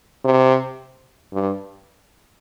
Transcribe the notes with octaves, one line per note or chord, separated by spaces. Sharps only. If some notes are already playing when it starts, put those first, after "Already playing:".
C3
G2